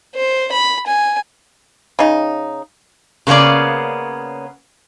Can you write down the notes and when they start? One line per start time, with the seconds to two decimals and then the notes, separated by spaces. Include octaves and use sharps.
0.15 C5
0.52 B5
0.86 G#5
1.99 C#3 D#4
3.27 C#3 A#3 B3 C#4 D5